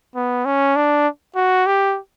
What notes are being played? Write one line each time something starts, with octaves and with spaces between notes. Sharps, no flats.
B3
C#4
D4
F#4
G4